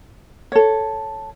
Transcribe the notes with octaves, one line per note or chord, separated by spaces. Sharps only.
A4 C#5